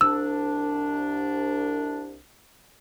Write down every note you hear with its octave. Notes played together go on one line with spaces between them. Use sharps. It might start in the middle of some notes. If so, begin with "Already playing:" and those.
C2 D4 E6